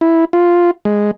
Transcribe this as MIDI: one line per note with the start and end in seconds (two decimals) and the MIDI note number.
0.01 0.25 64
0.33 0.71 65
0.85 1.11 56